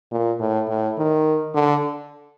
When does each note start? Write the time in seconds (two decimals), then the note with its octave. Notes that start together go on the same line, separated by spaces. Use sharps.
0.11 A#2
0.40 A2
0.68 A2
0.98 D#3
1.55 D3